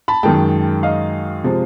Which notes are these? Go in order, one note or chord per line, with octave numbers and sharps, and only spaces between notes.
A5 B5
F#2 D#3 G#3 G5 A5
D#5 F5
C3 F3 G#3